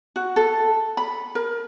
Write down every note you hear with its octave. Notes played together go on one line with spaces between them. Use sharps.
F#4
A4
B5
A#4